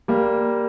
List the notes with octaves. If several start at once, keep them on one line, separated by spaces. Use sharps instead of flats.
G3 A#3